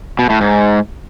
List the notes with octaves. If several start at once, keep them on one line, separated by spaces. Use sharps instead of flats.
B2
A2
G#2